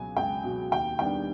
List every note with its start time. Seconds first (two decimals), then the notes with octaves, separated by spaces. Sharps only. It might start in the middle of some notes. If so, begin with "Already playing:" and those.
Already playing: C#2 B2 F#3 G#5
0.17 C#2 G5
0.44 B2 F#3
0.71 D#2 G5
0.99 D#3 G3 B3 D4 G5